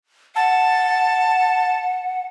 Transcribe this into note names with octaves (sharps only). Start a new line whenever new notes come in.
F#5 A5